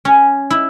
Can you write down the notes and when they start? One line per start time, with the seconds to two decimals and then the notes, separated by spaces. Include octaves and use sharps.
0.05 C#4
0.50 E4